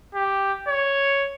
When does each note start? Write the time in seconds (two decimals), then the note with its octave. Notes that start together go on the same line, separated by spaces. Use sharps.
0.15 G4
0.68 C#5